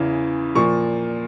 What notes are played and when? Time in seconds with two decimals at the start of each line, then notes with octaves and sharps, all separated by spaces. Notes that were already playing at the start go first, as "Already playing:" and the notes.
Already playing: E2 C#3 E3
0.55 A#2 F3 C#6